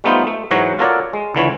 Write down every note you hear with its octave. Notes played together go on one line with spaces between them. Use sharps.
G3 A3 B3 D#4 F4 C5
A3
G#2 E3 F#3 F#4 C#5 A#5
F4 F#4 A4 A#4 C#5 D5
G#3
C#2 D3 E3 C#5